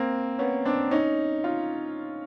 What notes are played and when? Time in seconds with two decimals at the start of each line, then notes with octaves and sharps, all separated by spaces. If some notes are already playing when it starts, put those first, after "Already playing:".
Already playing: A#3 C4
0.39 B3 C#4
0.65 C4 D4
0.91 C#4 D#4
1.44 D#4 F4